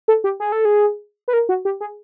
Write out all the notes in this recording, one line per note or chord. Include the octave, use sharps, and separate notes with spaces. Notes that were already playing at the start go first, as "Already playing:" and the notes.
A4
G4
G#4
A4
G#4
B4
A#4
F#4
G4
G#4